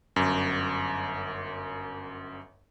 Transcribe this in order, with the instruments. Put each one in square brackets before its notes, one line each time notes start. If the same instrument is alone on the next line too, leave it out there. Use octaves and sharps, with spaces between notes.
[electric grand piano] G1 F#2